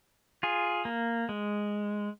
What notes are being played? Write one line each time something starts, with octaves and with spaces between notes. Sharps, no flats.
F4 G#4
A#3
G#3